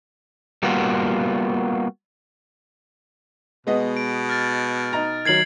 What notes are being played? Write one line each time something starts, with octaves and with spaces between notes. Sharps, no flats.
G3 A#3 B3 F4 F#4
B2 G#3 B3 D#5
D7
F6 A6 D7
D#4 A#5
D#3 F#3 G#6 C7 F#7